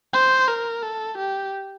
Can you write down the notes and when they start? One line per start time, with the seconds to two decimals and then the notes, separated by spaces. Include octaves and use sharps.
0.14 C5
0.48 A#4
0.83 A4
1.18 G4